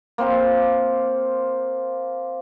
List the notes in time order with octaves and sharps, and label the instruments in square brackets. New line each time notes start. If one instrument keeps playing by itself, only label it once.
[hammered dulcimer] A#3 C4 C5 F5